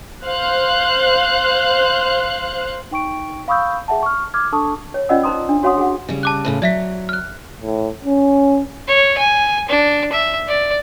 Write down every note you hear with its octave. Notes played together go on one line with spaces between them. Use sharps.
C5 F5 F#6
D#4 G5 C#6 D7
F5 B5 C#6 D#6 E6 G6
G#4 E5 F#5 A5
C#6 F6
D6 F6 G#6
D4 A4 A5 C#6 D#6
C#5
C#4 F4 D5 D#5 F#5 E6
D#4 C5 A#5 C6 D#6
D4
F#4 C#5 F5 F#5 C6 D#6
G#4 F#5
C#3 G3
A5 D6 F#6
A2 C#3 F4
F#3 D5 E5 B6
F6 F#6
A2
C#4
C#5
G#5
D4
E5
D5